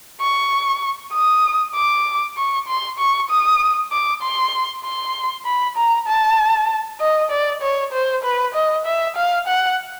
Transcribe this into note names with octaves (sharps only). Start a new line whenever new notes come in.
C#6
D#6
D6
C#6
C6
C#6
D#6
D6
C6
C6
B5
A#5
A5
D#5
D5
C#5
C5
B4
D#5
E5
F5
F#5